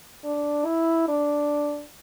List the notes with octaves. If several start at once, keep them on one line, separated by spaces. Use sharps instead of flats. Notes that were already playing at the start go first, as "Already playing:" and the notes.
D4
E4
D4